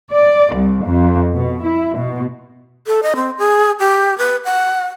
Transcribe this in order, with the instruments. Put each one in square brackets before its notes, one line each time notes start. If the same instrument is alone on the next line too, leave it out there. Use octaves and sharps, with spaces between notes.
[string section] D5
C2
F2
B2
E4
B2
[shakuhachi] A4
D#5
C4
G#4
G4
B4
F#5